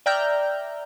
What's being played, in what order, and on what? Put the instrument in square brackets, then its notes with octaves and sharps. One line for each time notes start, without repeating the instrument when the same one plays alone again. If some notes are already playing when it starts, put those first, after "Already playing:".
[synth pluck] D5 E5 G5 A#5 F6 G6